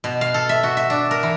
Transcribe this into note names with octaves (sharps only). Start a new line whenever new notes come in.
B2
F5
A4
E5
F#4
E5
D4
A#4
E3